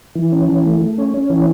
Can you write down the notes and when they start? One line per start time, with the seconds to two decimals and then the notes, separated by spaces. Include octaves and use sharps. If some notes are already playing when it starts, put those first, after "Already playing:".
0.15 E3
0.32 C#4
0.49 E3
0.65 A3
0.81 A3
0.98 C#4
1.14 C#4
1.30 E3